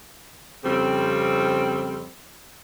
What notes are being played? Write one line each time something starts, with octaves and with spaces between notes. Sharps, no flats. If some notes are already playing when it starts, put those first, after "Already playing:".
F2 C#3 G3 C4